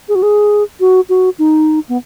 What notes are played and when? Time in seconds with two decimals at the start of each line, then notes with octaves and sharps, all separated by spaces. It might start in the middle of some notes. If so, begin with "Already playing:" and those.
0.09 G#4
0.15 F#4
0.23 G#4
0.80 F#4
1.09 F#4
1.39 D#4
1.89 B3